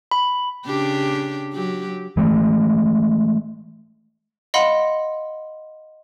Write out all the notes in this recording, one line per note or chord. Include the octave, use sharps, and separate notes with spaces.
B5
C#3 D4 G4
F#3 G4
E3 F#3 G#3 A3
D#5 F5 F#5 B5 C6